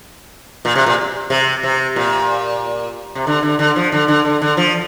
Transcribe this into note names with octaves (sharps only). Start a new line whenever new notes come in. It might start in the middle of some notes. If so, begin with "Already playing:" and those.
A#2
C3
A#2
C3
C3
A#2
C3
D3
D3
D3
F3
D3
D3
D3
D3
F3